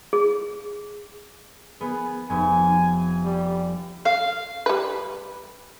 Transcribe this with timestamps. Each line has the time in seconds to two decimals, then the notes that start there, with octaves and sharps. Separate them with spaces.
0.13 G#4
1.81 B3 G#4
2.30 F1 G#5
3.25 G3
4.05 F5
4.66 G3 B4